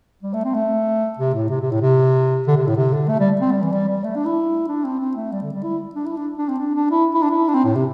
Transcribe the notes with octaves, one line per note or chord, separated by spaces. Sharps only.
G3
A3
C4
A3
C3
A2
C3
C3
A2
C3
D3
C3
A2
C3
D3
A3
G3
C4
G3
E3
G3
G3
A3
D4
E4
D4
C4
C4
A3
G3
D3
G3
E4
D4
E4
D4
D4
C4
D4
D4
E4
E4
D4
E4
D4
C4
A2
C3